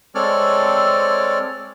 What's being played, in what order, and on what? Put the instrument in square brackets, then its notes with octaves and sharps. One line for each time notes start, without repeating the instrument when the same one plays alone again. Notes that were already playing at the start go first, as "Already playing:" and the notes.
[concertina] G#3 C4 A4 C#5 D5 F6